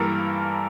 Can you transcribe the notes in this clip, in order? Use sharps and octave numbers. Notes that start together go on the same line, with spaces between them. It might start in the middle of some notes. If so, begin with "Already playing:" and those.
Already playing: G2 E3 G3 A#3 A4 A#4